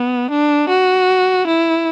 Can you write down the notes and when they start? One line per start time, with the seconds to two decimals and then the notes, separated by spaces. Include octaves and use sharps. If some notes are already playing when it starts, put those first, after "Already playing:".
Already playing: B3
0.31 D4
0.69 F#4
1.47 E4